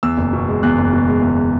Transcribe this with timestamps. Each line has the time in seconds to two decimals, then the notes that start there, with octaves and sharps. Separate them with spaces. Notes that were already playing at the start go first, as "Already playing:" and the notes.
0.03 E2 E6
0.18 F#1
0.33 B2
0.49 G#3
0.63 E2 F#6
0.78 F#1
0.93 B2
1.08 G#3
1.23 E2